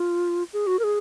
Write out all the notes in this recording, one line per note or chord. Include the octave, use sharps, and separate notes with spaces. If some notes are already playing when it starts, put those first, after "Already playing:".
Already playing: F4
G#4
F#4
A#4
G#4